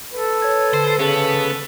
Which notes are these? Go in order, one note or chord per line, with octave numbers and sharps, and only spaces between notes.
A4 B4
C#5 G#6
D3 C5
C#3 B3 A4